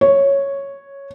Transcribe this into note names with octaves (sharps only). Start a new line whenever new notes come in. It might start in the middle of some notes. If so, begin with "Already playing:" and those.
C#5